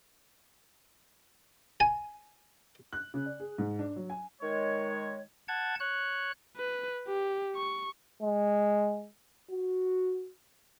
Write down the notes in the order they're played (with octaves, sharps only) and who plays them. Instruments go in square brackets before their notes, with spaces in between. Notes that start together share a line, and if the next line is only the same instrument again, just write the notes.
[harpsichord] G#5
[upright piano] F#6
C#3
D5
G#4
G#2
D4
F#3
G#5
[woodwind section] D#3 G#3 C#5
[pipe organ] F#5 A5 G#6
C#5 F#6
[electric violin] B4
G4
C#6
[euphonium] G#3
F#4